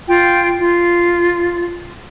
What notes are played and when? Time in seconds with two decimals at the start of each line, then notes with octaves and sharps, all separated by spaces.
0.08 F4 G5
0.58 F4